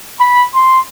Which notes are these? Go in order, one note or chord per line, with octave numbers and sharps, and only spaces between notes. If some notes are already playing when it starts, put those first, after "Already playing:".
B5
C6